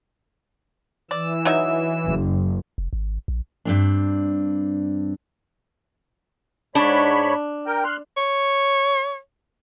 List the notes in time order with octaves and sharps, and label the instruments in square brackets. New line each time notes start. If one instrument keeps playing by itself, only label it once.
[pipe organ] E3 E6 [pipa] D5
[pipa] F#3 D#4 E5
[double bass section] F#1
[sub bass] F1
G#1
A#1
[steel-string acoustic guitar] G2 C4 D4
[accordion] G#2 C#5 B5 [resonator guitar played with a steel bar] D4
[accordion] A#4 G5
C6 F6 F#6
[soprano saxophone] C#5